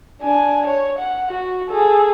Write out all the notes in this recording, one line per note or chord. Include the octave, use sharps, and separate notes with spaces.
D4 G#5
C#5
F#5
F#4
G#4 A4